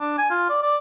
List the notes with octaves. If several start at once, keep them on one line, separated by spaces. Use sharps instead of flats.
D4
G#5
F4
D5
D5